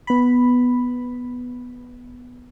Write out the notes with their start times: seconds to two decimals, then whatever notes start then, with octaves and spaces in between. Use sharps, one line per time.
0.07 B3 B5